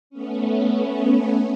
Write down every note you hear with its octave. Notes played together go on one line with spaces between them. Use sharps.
A3 B3 C#4